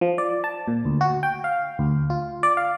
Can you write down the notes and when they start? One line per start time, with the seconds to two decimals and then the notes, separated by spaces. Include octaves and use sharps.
0.01 F3
0.18 D5
0.44 A5
0.68 A#2
0.85 D2
1.01 F#4
1.23 G5
1.44 F5
1.79 D2
2.10 F4
2.43 D5
2.57 F5